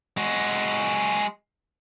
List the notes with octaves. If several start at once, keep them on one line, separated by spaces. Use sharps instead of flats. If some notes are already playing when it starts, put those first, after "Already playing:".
G#3 F#4